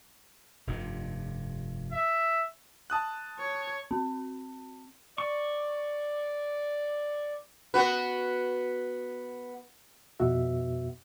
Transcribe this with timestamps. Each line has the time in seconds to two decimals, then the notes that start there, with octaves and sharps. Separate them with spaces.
0.67 F1 G2 C3
1.92 E5
2.90 A5 D#6 F#6
3.40 C#5
3.91 C4
5.18 D5 C#6
7.74 B3 F#4 B4
10.20 F2 B2 B3 F#4 E5